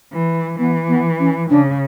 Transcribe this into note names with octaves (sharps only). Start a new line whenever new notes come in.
E3
E3 B3
B3
C#4
C#3 D4